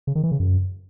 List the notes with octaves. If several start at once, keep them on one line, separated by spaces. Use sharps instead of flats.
C#3
D#3
E3
C#3
F#2